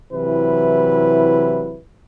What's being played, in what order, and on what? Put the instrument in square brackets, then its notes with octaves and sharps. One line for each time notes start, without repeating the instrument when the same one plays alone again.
[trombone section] C3 E3 F#3 E4 B4